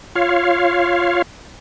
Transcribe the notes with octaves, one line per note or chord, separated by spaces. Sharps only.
F4 C#5 F5